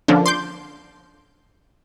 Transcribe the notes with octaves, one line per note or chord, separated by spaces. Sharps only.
D3 F3 A#3 C#4 D4
C6 D6 G6